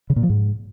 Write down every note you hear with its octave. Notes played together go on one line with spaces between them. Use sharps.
C#3
A#2
F3
G#2